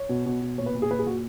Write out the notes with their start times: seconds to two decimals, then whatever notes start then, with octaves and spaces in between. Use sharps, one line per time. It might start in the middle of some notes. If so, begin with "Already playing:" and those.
Already playing: C#5
0.09 B2
0.26 B2
0.42 B2
0.58 A#2 C#5
0.66 B4
0.74 A#2
0.82 G#4
0.90 A#2 B4
0.99 G#4
1.06 A#2 F#4